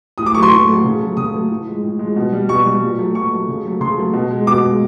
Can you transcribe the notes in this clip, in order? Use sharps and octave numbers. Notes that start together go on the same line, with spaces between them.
A2 D#6
D6
F#3 A3 C#6
C6
A2 C#6
F#3 A3
C#3
F#3 A3
C#3 D#6
F#3 A3
A2
F3 G#3
A2
F3 G#3
B2
G3
B2 C#6
G3
A#2
F#3 A3
A#2 C#6
F#3 A3
C#3
F#3 A3
C#3 C6
F#3 A3
B2
G#3
B2 D6
G#3